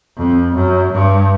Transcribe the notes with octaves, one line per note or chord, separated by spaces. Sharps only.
F2
F#2
G2